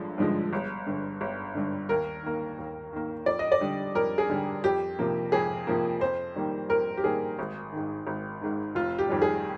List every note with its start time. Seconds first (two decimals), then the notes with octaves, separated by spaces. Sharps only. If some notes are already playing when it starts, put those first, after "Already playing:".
Already playing: G1 D3 F3 G#3
0.18 G2 D3 F3 G#3
0.53 G1
0.87 G2 D3
1.21 G1
1.55 G2 D3
1.89 D#2 A#4
2.23 D#3 A#3
2.59 D#2
2.93 D#3 A#3
3.26 F2 D5
3.39 D#5
3.52 D5
3.61 D3 G3
3.95 F2 A#4
4.18 G#4
4.30 D3 G3
4.64 F2 G4
4.99 C3 F3 A#3
5.32 F2 G#4
5.67 C3 F3 A#3
6.01 F2 C5
6.35 D#3 G3 A#3
6.69 F2 A#4
6.97 G4
7.03 D#3 G3 A#3 G#4
7.39 G#1
7.72 G#2 D#3
8.07 G#1
8.41 G#2 D#3
8.75 F1 F4
8.98 G4
9.09 F2 D#3 G3
9.22 G#4